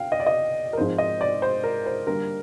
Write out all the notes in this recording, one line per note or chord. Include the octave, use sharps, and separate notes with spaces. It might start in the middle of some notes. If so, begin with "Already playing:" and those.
Already playing: F5 G5
D#5
D5
D#5
A#4
G#2 F3 G#3 C4 C5
D#5
D5
C5
A#4
C5
D3 G3 A#3 A#4